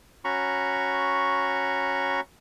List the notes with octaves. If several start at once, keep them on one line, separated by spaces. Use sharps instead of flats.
C#4 F#4 A#5 B5 C#6